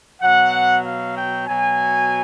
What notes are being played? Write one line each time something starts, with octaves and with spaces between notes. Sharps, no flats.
B2 F#3 F#5
F5
G5
B2 F#3 G#5